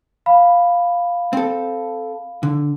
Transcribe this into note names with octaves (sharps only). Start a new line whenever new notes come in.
F5 B5
C4 A4
D3